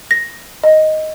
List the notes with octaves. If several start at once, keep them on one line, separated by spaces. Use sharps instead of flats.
A#6
D#5